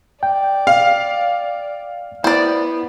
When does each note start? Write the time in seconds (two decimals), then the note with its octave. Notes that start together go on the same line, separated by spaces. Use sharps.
0.23 D5 G5
0.67 F5
2.24 B3 E4 C5 D5